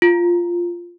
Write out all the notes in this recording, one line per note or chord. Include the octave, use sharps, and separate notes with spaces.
F4